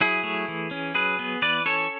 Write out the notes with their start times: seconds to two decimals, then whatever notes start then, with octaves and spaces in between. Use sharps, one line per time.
0.01 F#3 E4 G#4
0.23 A3
0.48 E3
0.71 C#4
0.94 F#3 G#4 B4
1.19 B3
1.42 E3 B4 D5
1.65 C#4 A4 C#5